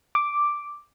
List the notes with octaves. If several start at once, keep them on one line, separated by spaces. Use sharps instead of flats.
D6